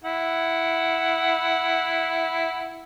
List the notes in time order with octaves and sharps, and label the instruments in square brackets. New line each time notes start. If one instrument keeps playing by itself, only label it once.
[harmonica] E4 F#5